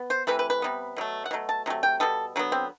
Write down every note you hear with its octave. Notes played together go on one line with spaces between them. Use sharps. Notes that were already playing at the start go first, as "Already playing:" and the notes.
Already playing: B3
C5
C3 E3 A3 B4
B4
B4
C3 G3 B3
B2 F#3 A3
F#5
B2 F#3 A3
A5
C3 F#3 A3
G5
B2 G3 B3 A4
D3 F#3 B3
C4